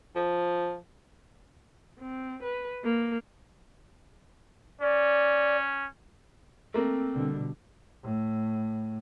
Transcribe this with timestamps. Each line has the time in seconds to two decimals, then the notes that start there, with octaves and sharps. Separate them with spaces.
0.16 F3
1.99 C4
2.43 B4
2.84 A#3
4.81 C#4 D5
6.74 A3 A#3 C4
7.12 B2 D3 G3
8.04 A2